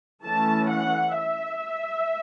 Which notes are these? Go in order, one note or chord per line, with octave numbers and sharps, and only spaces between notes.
E3 A3 C#4 A5
F#5
E5